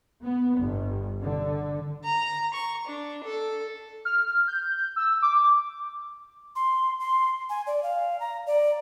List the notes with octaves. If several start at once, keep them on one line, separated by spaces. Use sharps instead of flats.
B3
G1
D3
A#5
C#6
D4
A4
F6
G6
E6
D6
C6
C6
G#5
D5
F5
A#5
D5